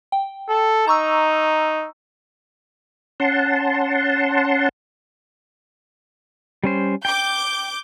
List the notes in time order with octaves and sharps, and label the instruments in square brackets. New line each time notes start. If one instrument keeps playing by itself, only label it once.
[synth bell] G5
[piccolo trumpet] A4
[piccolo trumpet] D#4 [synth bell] A#5 C#6 E6
[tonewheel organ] C#4 F#5 A5 C6
[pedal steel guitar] G3 C#4 C5
[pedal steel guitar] G5 [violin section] D6 G6